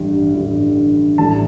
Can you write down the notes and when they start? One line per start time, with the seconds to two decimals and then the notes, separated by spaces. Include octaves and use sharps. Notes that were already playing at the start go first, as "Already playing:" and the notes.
Already playing: A1 G2 D3 G3
0.34 A1 G2 D3 G3
1.18 A1 A2 G3 A5